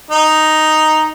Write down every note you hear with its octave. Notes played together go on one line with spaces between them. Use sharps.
D#4